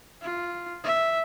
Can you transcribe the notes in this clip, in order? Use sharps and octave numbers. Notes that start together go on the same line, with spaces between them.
F4
E5